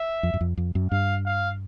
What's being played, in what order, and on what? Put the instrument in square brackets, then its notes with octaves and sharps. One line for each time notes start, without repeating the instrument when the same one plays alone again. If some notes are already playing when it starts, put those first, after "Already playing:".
Already playing: [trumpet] E5
[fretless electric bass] F2
F#2
F2
F2
F#2
[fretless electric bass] G2 [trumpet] F5
[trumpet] F5